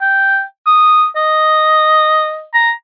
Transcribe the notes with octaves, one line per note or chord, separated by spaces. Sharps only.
G5
D#6
D#5
A#5